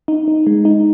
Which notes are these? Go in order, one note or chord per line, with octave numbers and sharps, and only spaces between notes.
D#4
D#4
G#3
D#4